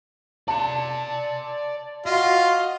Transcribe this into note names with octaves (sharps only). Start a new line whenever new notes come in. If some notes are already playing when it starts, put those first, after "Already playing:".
D5 A5 C6
F4 F#4 D#5